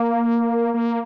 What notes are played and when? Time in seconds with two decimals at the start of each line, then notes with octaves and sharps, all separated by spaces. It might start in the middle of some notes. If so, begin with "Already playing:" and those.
Already playing: A#3
0.74 A#3